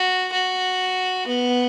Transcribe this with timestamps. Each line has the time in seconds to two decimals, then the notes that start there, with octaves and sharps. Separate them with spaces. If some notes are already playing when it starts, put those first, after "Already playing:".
Already playing: F#4
0.32 F#4
1.27 B3